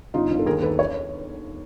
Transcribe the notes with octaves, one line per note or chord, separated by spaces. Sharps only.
G1 D#4 F4
G1
A4
D#2 G#4 A#4
D#2 A4 B4
B4 C#5